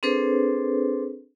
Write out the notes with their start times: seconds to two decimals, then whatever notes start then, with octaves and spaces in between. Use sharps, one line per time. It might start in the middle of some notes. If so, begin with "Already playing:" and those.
0.03 C4 D4 G#4 A4 B4 C5